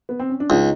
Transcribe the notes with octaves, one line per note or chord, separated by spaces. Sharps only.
B3
C4
C#4
D4
C#2 D#4